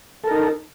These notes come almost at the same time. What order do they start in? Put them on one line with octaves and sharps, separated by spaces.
A4 A#4 D#4